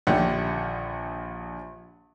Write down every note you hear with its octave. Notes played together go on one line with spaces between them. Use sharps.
A#1 D#2 D3